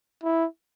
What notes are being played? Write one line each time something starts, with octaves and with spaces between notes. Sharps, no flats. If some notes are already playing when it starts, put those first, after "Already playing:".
E4